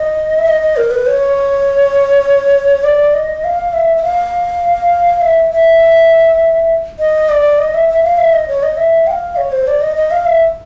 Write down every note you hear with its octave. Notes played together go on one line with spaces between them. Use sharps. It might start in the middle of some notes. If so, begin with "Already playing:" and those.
Already playing: D#5
E5
D#5
D#5
A#4
B4
C#5
D5
D#5
F5
E5
E5
F5
E5
E5
D#5
D5
D#5
E5
E5
F5
E5
D#5
C#5
D#5
E5
G5
F5
C#5
C5
D5
D#5
D#5
F5
E5